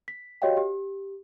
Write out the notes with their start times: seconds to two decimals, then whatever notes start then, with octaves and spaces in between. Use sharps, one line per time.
0.08 B6
0.42 F#4 G4 C#5 D#5 F5 G5
0.57 G4